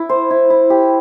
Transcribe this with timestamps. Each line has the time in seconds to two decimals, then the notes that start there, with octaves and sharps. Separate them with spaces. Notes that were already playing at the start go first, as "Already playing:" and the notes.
Already playing: E4
0.09 C5
0.30 E4
0.50 E4
0.70 G4